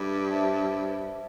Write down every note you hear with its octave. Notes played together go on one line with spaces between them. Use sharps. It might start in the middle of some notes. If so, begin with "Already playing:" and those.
Already playing: G2 A4 E5 B5 D6
C5 E5 A5